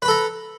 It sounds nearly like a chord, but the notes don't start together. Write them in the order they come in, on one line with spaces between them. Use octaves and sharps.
B4 B5 A4 A#5